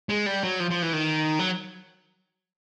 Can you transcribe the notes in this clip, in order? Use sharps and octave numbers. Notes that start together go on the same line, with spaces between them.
G#3
G3
F#3
F3
F3
E3
D#3
F#3